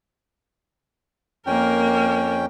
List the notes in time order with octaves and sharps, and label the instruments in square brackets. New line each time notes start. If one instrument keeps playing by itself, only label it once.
[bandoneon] F2 C#4 G5 [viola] A#3 A#4